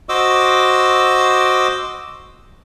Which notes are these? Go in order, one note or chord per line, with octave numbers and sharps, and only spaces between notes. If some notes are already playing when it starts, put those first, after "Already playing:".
F#4 C5 D#5 D6 E6